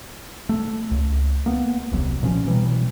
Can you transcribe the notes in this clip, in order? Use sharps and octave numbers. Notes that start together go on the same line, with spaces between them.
A3
C#2
A#3 B3
D#1 C2 F#3
A#2 F3 C#4
B2 E3 F#3 G3